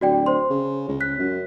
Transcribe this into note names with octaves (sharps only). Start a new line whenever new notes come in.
D1 F#4 D5 G5
C5 C6
C#3
C#2
F#6 B6
F#2